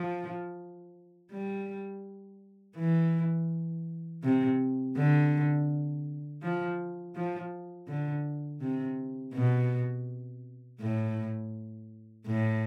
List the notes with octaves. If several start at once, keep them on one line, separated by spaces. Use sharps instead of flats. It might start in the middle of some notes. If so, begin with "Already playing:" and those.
Already playing: F3
G3
E3
C3
D3
F3
F3
D3
C3
B2
A2
A2